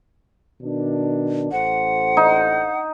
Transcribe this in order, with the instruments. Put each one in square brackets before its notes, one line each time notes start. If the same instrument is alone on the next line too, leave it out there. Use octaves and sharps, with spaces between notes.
[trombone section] B2 D#3 D4
[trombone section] A1 A4 C5 [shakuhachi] F#5
[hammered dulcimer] D#4